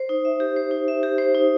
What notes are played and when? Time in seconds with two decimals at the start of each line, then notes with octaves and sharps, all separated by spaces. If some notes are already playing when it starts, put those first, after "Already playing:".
Already playing: C5
0.09 D#4
0.25 E5
0.40 G4
0.56 C5
0.71 D#4
0.88 E5
1.03 G4
1.18 C5
1.35 D#4